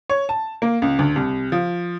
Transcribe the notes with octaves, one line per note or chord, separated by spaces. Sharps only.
C#5
A5
A#3
C#2
D2
C2
F3